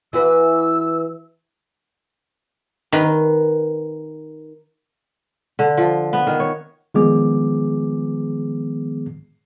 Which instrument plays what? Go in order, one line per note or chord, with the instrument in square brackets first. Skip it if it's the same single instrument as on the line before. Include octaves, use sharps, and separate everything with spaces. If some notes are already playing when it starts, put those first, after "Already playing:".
[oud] E3 F#4 B4 [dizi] E6
[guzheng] D#3 B4
[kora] D3
F3
B3
D#3
C#5
[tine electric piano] D#3 F3 G#3 B3 G#4 D6